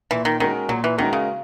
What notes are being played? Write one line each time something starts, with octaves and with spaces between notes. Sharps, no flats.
A#2 E3
D#3
D#3 G#3 C#4 F#4 A#4
A#2 F#3
E3
D#3 G#3 C#4 F#4 A#4
C#3